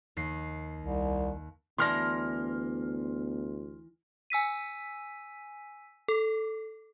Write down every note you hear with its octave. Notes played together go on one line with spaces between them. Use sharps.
D#2 C7
C2
D2 E3 B3 D4 C6 F6 A#6
G#5 E6 B6 D#7
A4